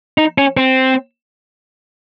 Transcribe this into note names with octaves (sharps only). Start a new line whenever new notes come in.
D#4
C#4
C4